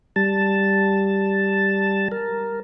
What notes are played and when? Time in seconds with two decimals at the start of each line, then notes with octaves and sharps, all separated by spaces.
0.16 G3 A5
2.12 A#4